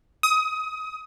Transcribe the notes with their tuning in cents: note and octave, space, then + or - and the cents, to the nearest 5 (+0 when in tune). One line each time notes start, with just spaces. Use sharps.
D#6 +25